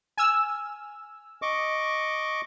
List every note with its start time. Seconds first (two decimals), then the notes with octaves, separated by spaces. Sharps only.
0.18 G#5 E6 F6
1.42 D#5 C#6 D6